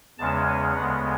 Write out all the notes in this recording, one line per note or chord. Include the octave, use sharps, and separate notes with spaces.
E2 C#3 G#3 C#4 A5
G#5
D2 C#3 G#3 B3 F#5